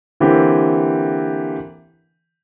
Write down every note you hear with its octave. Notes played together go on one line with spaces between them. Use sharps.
D3 E3 A#3 C4 G4